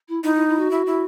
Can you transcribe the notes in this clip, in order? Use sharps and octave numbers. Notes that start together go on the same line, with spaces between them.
E4
D#4 E4
E4
E4
F#4
E4
E4